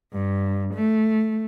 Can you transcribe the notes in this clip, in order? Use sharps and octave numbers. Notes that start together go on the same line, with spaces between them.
G2
A3